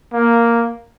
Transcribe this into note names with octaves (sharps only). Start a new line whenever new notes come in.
A#3